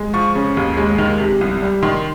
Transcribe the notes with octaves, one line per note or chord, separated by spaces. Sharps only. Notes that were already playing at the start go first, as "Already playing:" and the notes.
Already playing: G#3
F3 C#6
C#3
D#2
G#3
D#3
C3
C2
G3
D#3 C6